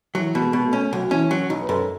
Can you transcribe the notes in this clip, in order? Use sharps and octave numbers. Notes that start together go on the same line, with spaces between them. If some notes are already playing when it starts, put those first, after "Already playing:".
E3 F#3
B2
G#3
B2
A3
C#4
B1 F#3
E3 C#4
F#3 C#4
B1 D#4
B4
F#2 A4